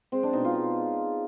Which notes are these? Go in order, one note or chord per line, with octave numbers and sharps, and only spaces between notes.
G#3 C4
D4
B2 D#4
F4
G#3